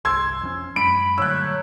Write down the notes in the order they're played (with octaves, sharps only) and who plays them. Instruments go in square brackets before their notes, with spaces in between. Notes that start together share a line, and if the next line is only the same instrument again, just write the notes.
[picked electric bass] G1 C2 [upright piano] C6 E6 G#6
[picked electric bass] F2 F3 C#4
[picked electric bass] F#2 G#3 [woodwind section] B5 [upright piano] D7
[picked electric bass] G2 A#2 D3 [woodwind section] F#3 A3 C#5 [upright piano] E6 F#6